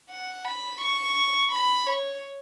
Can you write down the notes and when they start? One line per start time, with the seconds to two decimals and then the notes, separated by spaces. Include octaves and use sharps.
0.10 F#5
0.45 B5
0.81 C#6
1.52 B5
1.87 C#5